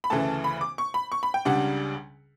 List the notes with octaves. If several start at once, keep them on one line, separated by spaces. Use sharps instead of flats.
B5
D2 C#3 E3 A3 A5
B5
D6
C#6
B5
C#6
B5
G5
C#2 C#3 G3 D4 F#5